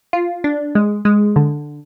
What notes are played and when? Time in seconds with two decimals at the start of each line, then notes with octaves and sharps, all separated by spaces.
0.13 F4
0.44 D4
0.75 G#3
1.05 G#3
1.36 D3